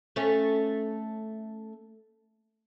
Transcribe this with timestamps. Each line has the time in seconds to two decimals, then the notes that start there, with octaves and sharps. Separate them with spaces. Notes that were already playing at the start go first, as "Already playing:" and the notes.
0.16 A3 C#4